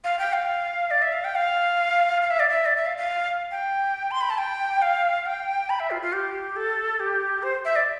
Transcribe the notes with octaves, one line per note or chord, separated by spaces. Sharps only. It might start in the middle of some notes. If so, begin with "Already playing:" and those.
F5
G5
F5
D5
E5
F5
G5
F5
F5
E5
D5
E5
D5
E5
F5
F5
G5
C6
B5
A5
G5
F5
G5
B5
E5
F4
F4
G4
A4
G4
C5
E5
D5